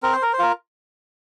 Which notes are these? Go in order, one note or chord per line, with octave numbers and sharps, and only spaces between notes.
C4 A#4
C5
A#4
C5
F4 A#4